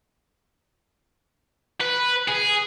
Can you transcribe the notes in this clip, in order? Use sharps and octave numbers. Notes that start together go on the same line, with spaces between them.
B4
G#4